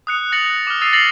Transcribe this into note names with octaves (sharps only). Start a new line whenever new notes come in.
D#6 F#6 C#7
F#6 A6 A#6 C#7 F7 F#7
D6 F6
D#6 E6 A6 C7 D#7
A6 A#6 C7 F7 F#7